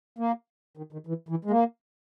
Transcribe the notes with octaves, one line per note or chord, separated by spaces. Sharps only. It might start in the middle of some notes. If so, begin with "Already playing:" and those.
A#3
D#3
D#3
E3
E3
G#3
A#3